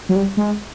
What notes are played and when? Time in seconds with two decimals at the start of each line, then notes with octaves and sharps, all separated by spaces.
0.09 F#3
0.16 G3
0.37 G#3